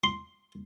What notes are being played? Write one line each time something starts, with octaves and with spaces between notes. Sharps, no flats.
C6